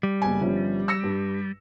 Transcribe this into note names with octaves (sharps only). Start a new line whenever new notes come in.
G3
F#1 B3 G#5
G1 F3 C#4
E6 A#6 C#7
G2